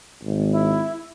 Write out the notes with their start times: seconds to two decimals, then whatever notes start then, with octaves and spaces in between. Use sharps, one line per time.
0.22 G#1
0.52 E4